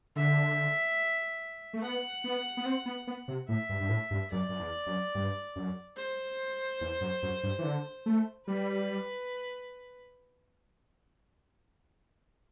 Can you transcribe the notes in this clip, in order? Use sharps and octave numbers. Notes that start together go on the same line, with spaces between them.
D3 E5
A3
B3 F#5
B3
B3
C4
B3
B3
C3
A2 E5
G2
G2
A2
G2
F#2 D5
F#2
E2
F#2
G2
F#2
C5
E2
F#2
F#2
G2
E3
D3
A3
G3 B4